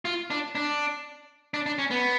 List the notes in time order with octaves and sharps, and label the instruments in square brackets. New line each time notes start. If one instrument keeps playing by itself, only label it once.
[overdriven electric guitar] F4
D4
D4
D4
D4
C#4
B3